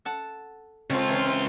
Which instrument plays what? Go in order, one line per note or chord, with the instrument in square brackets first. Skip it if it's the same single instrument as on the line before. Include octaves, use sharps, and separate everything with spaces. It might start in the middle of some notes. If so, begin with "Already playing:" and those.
[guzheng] A4 F#5 A5
[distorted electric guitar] C#2 F4 [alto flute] C4 [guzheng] C#4 A4 C6
[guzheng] E3 A#4 C#5